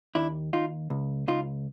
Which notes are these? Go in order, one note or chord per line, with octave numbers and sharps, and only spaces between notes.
D#2 D4 E4
D#2 D#4 F4
C#2
C#2 D#4 F4